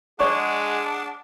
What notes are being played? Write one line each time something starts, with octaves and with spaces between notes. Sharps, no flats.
G#3 D4 G#4 D5 F#5 C#6